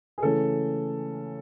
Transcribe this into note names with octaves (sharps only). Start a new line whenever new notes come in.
G#4
C#3 E3 A3 C#4 A4